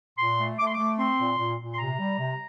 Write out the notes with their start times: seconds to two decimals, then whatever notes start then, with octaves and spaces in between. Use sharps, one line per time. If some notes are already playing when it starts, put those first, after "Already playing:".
0.18 A#2 C6
0.39 A3
0.59 A3 D6
0.67 C6
0.74 A3 D6
0.99 C4 C6
1.19 A#2
1.38 A#2
1.59 A#2
1.74 C6
1.79 C3 A#5
1.99 G3
2.19 C3